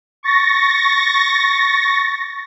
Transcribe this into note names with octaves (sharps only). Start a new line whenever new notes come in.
C#6 A6 A#6